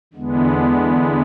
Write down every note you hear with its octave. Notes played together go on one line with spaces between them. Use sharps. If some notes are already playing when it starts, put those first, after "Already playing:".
E2 D3 G#3 B3